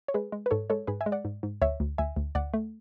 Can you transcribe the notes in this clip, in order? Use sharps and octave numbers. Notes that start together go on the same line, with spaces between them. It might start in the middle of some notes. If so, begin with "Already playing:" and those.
C#5
G#3 G#4 B4
G#3
B4
G#2 A4 C#5
G#3 A4 C#5
G#2 G#4 B4
E5 G#5
G#3
D5 F#5
G#2
G#2
D2 C#5 E5
D2
D2 E5 G#5
D2
D2 D5 F#5
A3